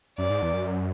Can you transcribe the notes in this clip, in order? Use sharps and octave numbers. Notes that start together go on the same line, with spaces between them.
F#2 D5
G#2
E2
F#2